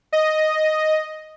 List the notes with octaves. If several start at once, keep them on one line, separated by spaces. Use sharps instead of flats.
D#5